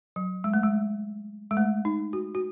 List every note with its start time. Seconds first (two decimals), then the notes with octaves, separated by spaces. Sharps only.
0.16 F#3
0.44 G#3
0.54 A3
0.63 G#3
1.51 G#3
1.57 A3
1.85 D#4
2.13 F#4
2.35 F#4